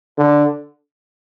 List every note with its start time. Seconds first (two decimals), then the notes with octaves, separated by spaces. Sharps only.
0.18 D3